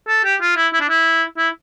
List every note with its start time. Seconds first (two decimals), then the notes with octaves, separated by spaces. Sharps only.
0.08 A4
0.24 G4
0.41 F4
0.56 E4
0.73 E4
0.81 D4
0.89 E4
1.37 E4